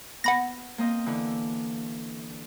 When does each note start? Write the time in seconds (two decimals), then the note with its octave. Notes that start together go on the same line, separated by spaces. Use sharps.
0.24 B3 F#5 B5 A#6
0.78 A#3 C4 D#5
1.06 D3 E3